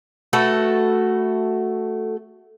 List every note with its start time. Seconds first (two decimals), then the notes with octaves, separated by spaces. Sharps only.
0.33 A3 F#4 A4 B4